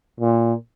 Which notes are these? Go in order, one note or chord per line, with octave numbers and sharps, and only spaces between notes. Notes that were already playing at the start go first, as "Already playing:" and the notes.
A#2